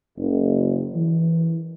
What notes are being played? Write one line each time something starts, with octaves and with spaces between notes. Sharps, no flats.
F#1
E3